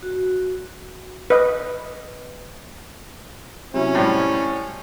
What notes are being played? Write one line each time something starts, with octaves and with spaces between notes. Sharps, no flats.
F#4
B4 D#5
C3 F#3 C#4 E4
A2 G3 C5 C#5